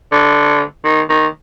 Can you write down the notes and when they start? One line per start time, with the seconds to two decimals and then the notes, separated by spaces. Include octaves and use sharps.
0.12 D3
0.84 D#3
1.09 D#3